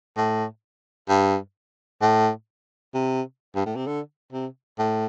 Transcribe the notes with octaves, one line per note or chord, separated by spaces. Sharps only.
A2
G2
A2
C3
G2
A2
C3
D3
C3
A2